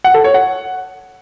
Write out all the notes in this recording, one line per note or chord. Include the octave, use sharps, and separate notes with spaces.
F#5
A4
C#5
F#5